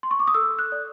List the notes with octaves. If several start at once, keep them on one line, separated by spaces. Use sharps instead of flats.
C6
C#6
D6
D#6
A4 E6
F#6
D5